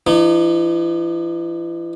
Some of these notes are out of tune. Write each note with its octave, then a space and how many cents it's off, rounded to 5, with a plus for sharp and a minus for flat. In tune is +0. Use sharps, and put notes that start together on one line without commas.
E3 +40 D#4 -30